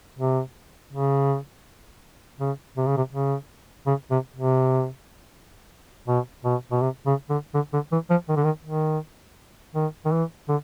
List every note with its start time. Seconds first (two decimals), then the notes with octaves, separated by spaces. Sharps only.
0.18 C3
0.93 C#3
2.40 C#3
2.77 C3
2.87 C#3
2.97 C3
3.12 C#3
3.86 C#3
4.10 C3
4.36 C3
6.07 B2
6.44 B2
6.71 B2
6.81 C3
7.06 C#3
7.29 D3
7.54 D3
7.73 D3
7.92 E3
8.10 F3
8.29 D#3
8.36 D3
8.44 D#3
8.65 D#3
9.75 D#3
10.05 D#3
10.12 E3
10.48 D3